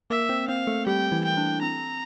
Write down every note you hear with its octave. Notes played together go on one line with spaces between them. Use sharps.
A#3 A#4 E5
C4 C5
C4 C5 F5
A3 A4
G3 G4 G5
E3 E4
G5
D4
C4 A#5